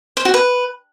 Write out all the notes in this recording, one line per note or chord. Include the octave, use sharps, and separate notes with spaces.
C5
F#4
B4